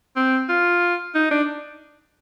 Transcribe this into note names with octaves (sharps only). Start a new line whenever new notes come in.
C4
F4
D#4
D4